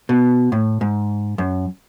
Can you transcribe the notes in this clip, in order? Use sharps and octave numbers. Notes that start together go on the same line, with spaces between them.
B2
A2
G#2
F#2